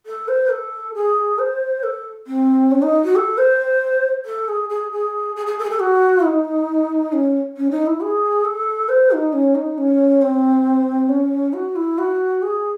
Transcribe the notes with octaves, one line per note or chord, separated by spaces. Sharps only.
A4
C5
A4
G#4
C5
A4
C4
C#4
D#4
F#4
A4
C5
A4
G#4
G#4
G#4
G#4
G#4
A4
G#4
A4
F#4
D#4
C#4
C#4
D#4
E4
G#4
A4
C5
D#4
C#4
D#4
C#4
C4
C#4
F#4
E4
F#4
G#4